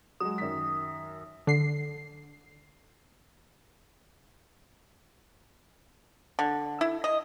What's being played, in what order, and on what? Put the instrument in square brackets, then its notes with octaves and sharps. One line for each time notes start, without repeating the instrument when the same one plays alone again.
[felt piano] F#3 G#3 [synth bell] D#6
[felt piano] F#2 D#3 B6
[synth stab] D3 C7
[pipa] D3
E4
D#5